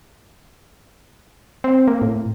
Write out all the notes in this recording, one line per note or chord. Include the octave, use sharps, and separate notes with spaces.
C4
A#3
A2